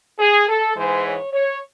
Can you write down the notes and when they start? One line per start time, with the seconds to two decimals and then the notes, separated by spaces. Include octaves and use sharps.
0.19 G#4
0.48 A4
0.76 G#2 E3 G#3 C5
1.05 C#5
1.32 C#5